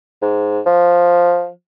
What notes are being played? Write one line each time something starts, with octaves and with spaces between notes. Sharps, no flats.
G#2
F3